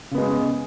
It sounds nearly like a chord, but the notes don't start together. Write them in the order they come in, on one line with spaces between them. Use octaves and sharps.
C#3 B3 G#3